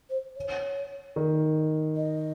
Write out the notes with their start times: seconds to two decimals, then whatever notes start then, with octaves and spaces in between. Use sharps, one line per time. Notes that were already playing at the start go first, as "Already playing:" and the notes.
0.10 C5
0.36 C#5
1.16 D#3
1.96 D#5